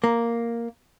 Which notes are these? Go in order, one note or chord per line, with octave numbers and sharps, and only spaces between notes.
A#3